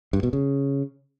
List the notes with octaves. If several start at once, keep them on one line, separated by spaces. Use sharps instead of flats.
G2
B2
C#3